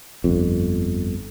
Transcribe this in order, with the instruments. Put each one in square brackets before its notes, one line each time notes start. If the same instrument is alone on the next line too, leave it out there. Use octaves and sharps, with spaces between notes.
[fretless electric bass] G1 F2